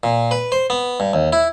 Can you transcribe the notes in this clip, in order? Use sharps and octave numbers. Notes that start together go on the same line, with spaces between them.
A#2
B4
C5
B3
G2
D#2
E4